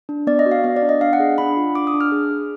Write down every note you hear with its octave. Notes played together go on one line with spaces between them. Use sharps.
D4
B3 D5
D#5
F#4
F5
B3 D#5
D5
D4
D#5
D4 F5
F#5
G#4
D4 B5
F4
D4 D6
D#6
D4
F6
G#4
G#4